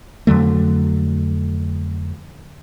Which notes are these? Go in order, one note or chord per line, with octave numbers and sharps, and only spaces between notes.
F2 D3 F#3 A3